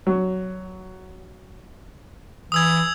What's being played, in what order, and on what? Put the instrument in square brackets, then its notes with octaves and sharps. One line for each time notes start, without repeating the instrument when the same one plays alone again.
[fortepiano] F#3
[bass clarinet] E3 [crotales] D#6 E6 G#6